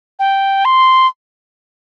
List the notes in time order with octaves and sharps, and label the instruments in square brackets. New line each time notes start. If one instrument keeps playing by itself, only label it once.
[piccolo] G5
C6